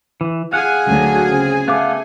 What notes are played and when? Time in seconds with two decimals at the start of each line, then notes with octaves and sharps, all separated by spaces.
0.21 E3
0.53 G#4 F5 F#5 G#5
0.85 D2 F#3
1.28 C#3 C4
1.68 A3 B3 F5 D6